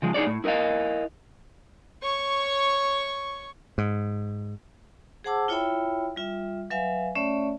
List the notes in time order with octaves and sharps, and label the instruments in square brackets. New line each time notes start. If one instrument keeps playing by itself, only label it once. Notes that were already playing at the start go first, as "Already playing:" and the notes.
[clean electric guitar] C#3 F3 G#3
D#4 G#4 C#5 D5
A2
E4 A#4 B4 D#5 F5
[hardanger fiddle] C#5 C#6
[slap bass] G#2
[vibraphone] G#4 C5 F#5 A5 D6 E6
E4 F4 C#5 E5 G5 B5
G3 F4 E5
F#3 B4 E5 F5 G#5
A3 C#4 C#5 D5 E5